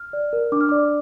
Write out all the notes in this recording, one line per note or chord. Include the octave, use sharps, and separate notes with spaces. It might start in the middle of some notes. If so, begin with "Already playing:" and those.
Already playing: F6
D5
A#4
D4 D6
F6
D5 D6